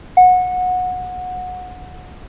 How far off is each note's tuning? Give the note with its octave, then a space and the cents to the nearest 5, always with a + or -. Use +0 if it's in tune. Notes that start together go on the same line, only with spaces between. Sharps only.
F#5 -20